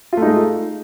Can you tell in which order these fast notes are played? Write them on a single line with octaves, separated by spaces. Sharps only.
F4 A3 D#4 G#3